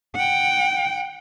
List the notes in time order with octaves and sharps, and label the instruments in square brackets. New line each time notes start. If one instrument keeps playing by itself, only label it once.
[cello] F#5 G5